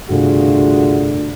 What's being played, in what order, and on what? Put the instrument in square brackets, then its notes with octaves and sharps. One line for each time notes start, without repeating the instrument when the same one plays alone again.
[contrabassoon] D2 [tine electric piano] G2 C3 [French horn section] F4 F#4 G#4